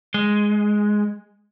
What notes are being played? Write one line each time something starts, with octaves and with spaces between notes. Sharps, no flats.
G#3